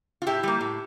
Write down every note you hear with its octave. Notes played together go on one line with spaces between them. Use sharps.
F4
A2 E4 G4
G3 A#3
A2